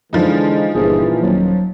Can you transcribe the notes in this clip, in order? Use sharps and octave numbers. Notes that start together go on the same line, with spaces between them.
D3 E3 F3 G#3 D#4
G1 A#2 E3 G#4
D#1 F#3